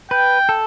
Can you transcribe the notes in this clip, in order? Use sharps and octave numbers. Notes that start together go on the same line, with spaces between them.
B4 G5
A4